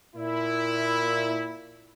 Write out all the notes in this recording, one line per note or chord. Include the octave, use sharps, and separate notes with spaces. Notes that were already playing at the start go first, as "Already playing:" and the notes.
A#2 E4